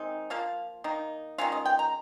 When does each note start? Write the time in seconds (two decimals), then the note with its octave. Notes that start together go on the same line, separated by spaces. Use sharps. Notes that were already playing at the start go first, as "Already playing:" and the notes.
Already playing: D#3 G#3 C4 D#4
0.30 F3 A#3 F4 F5
0.84 D#3 A#3 D#4
1.38 D#3 G#3 C#4 F4 F5
1.52 D#5
1.66 G5
1.79 A#5